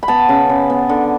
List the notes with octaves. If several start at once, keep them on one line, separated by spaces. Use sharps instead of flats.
B5
B3 A5
C#3
C#3
B3
D3